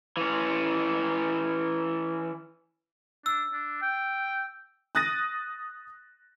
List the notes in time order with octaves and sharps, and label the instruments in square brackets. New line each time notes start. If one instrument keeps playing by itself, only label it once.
[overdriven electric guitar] E3 C#4
[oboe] D4 [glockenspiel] E6
[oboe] D4
G5
[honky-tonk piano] D#6 F#6 A6 A#6 D#7